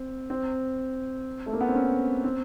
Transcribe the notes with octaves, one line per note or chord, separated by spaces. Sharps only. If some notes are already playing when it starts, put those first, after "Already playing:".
Already playing: C4
C4
A3
A#3
B3
C4
C#4
C4